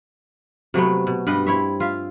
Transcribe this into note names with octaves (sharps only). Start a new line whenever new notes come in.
C3 F#3 A3 B3
B2
G2 G3 B4 D#5
C4 E4 C#5 E5
F4 E5 F5